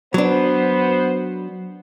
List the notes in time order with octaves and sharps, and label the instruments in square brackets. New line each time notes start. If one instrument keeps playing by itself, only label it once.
[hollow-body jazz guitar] F#3 D4 [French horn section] B3 C5